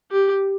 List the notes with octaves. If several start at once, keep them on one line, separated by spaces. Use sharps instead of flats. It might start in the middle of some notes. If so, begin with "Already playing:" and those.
G4